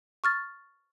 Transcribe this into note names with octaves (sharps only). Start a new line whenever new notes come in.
C#6 F6 A6